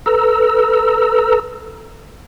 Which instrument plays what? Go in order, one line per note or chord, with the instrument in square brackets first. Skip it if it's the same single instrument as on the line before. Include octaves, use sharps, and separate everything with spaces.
[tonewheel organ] A4 B4 A#5 E6